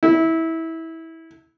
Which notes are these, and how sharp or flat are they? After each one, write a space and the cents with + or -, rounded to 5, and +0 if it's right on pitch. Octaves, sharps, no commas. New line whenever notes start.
E4 -20